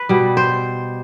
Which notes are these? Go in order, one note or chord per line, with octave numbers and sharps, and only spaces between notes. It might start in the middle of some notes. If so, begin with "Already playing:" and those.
Already playing: B4
B2 G3
C5